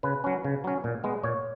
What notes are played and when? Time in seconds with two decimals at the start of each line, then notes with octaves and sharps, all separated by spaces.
0.03 C#3 B4
0.24 F#3 C#4
0.45 C#3
0.64 F#3 C#4
0.84 A#2
1.04 G#3 B3
1.23 A#2 C#5